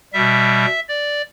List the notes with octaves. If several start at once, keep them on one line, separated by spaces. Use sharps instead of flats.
B2 G3 E5
D5